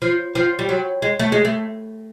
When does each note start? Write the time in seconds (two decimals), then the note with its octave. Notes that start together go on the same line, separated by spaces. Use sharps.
0.02 F3
0.35 F3
0.59 G3
0.69 F#3
1.02 G#3
1.19 A3
1.32 G#3
1.45 A3